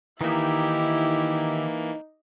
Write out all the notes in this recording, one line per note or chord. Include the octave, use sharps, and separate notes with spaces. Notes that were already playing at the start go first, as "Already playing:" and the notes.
D#3 E3 A#3 D#4 E4 G4 E5